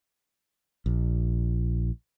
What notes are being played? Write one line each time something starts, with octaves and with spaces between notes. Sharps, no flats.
A#1